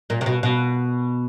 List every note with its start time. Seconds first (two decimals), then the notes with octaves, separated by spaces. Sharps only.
0.10 A#2
0.21 C3
0.26 B2
0.43 B2